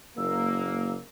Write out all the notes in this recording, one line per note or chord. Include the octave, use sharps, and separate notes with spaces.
F#1 A#3 E6